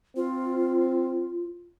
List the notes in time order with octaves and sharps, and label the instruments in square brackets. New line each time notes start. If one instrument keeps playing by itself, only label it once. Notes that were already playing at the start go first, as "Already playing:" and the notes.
[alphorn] C4 [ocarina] F4